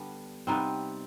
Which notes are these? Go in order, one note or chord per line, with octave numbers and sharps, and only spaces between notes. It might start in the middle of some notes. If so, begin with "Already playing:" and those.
Already playing: D3 G3 B3
C3 G3 B3 C4 D#4